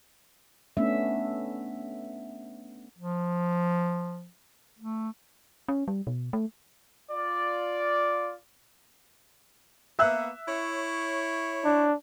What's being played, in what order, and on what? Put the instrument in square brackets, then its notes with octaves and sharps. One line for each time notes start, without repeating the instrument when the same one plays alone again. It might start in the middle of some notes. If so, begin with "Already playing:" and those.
[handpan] A3 B3 C#4 D4 E5
[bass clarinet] F3
A3
[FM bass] C#4
G3
B2
A3
[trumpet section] F4 D5
[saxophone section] A#3 B3 [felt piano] E5 E6 F#6
[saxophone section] E4 C#5
[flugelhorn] D4